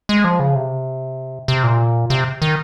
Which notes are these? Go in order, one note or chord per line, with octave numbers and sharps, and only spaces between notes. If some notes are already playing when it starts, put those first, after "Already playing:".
G#3
F3
C#3
C3
C3
A#2
C3
D#3